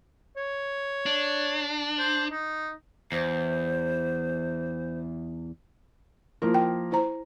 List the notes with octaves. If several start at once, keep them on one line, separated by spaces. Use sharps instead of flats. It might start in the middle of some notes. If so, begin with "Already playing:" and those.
C#5
D4
C5
D#4
E2 C5
F3 A#3 E4 A#4
G5
E4 C5 A#5